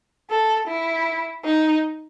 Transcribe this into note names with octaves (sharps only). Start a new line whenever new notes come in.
A4
E4
D#4